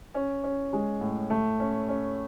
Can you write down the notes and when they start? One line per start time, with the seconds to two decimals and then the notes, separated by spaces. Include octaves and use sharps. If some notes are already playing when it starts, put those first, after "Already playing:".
0.14 C#4
0.44 C#4
0.73 G#3
1.01 A2
1.30 A3
1.60 C#4
1.89 C#4